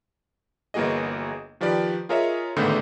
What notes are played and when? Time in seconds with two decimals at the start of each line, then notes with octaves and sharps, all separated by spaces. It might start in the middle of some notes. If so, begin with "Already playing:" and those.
0.74 G1 E3 A#3 F#4 G#4 D#5
1.61 D#3 F3 G4 B4 D5
2.09 F4 G#4 A#4 C#5 D#5 E5
2.57 A1 G#2 D3 D#3 A3 B3